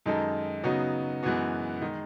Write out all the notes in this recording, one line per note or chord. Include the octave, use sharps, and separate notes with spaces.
F#2 D#3 G#3 D#4 A4
C#3 F#3 B3 D#4 F#4
F#2 E3 G#3 B3 F#4
D#3 G#3 D#4